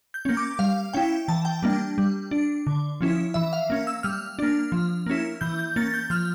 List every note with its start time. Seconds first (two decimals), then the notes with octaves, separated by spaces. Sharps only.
0.14 G6
0.25 A#3 C#4
0.37 D6
0.59 G3 F5
0.94 C#4 E4 G5
1.28 E3 A5
1.45 G5
1.63 G3 A#3 D4
1.98 G3
2.31 D4
2.67 D3
3.01 F3 C#4 E4
3.34 E3 E5
3.53 F5
3.70 A#3 C#4
3.87 E6
4.03 G3 F6
4.39 A#3 D4
4.72 F3
5.06 A#3 C#4 E4
5.41 E3 G6
5.59 G6
5.76 A#3 C#4 A6
5.94 G6
6.10 F3 F6